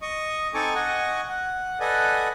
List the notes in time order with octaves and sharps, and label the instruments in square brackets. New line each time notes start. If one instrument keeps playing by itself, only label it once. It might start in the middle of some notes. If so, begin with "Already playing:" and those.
[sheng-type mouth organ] D#5 C#6 D#6
C4 D#4 A4 G#5 C#6 D6
D#5 F#5 G#5 C#6
F#5
A4 B4 D5 D#5 F#5 G#5